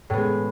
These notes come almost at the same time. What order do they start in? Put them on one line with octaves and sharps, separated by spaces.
A2 B3 G#3